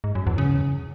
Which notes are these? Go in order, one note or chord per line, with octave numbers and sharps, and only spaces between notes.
G#2
F#2
E2
C#3